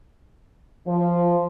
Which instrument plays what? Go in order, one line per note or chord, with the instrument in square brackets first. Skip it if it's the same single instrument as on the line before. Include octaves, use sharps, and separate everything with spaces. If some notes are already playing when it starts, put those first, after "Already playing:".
[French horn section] F3